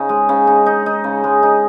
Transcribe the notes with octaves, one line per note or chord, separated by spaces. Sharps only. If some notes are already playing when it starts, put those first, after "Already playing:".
Already playing: C#3 D#4
G#3
C#3
D#4
D#4
D#4
C#3
G#3
D#4